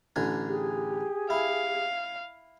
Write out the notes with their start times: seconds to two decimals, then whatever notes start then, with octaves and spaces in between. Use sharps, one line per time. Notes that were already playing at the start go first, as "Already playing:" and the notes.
0.16 A1 D3 G#5
0.47 G4 G#4
1.30 E4 F5